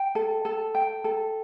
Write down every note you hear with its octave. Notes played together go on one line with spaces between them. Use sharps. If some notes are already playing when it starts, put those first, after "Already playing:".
Already playing: G5
A4
A4
G5
A4